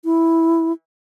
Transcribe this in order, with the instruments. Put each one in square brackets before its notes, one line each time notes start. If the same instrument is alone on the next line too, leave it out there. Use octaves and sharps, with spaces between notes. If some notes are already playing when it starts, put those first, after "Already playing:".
[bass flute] E4